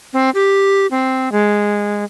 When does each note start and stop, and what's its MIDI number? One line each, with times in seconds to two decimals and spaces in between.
0.13 0.30 60
0.35 0.87 67
0.91 1.31 60
1.32 2.04 56